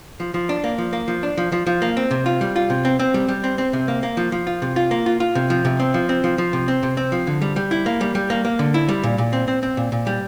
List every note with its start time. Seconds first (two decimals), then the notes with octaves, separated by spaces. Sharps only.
0.20 F3
0.34 F3
0.49 D4
0.64 A#3
0.78 F3
0.93 A#3
1.08 F3
1.23 D4
1.37 F3
1.52 F3
1.67 F3
1.82 A#3
1.97 C4
2.11 C3
2.26 F4
2.41 G3
2.56 F4
2.70 C3
2.85 C4
2.99 C4
3.14 G3
3.28 G3
3.44 C4
3.58 C4
3.73 C3
3.88 A#3
4.03 A#3
4.17 F3
4.32 F3
4.47 F4
4.62 C3
4.76 F4
4.91 A#3
5.06 F4
5.20 F4
5.35 C3
5.50 F3
5.65 C3
5.79 C4
5.94 F3
6.09 C4
6.24 F3
6.38 F3
6.53 C3
6.68 C4
6.83 C3
6.97 C4
7.12 F3
7.27 D3
7.42 G3
7.56 G3
7.71 E4
7.86 A#3
8.01 G3
8.15 G3
8.30 A#3
8.45 A#3
8.59 D3
8.74 E4
8.89 G3
9.03 A#2
9.18 A#2
9.33 C4
9.48 C4
9.63 C4
9.77 A#2
9.92 A#2
10.07 G3